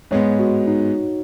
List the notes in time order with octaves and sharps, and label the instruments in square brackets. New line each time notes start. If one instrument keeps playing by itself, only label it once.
[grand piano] G#2 G#3 B3 [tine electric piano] C#5
[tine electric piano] F#4
D#4